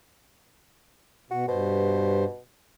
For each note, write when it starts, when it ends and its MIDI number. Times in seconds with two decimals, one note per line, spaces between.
1.31 1.45 47
1.31 1.46 66
1.48 2.24 43
1.48 2.40 47
1.48 2.24 72